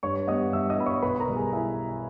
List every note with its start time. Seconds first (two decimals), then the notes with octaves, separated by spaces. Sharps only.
0.03 G2 C#5 C#6
0.28 G3 B3 D#5 D#6
0.53 G2 E5 E6
0.70 D#5 D#6
0.78 G3 B3 B5
0.86 C#5 C#6
1.02 B1 B4 B5
1.19 A#4 A#5
1.28 B2 G3
1.36 G#4 G#5
1.52 E4 E5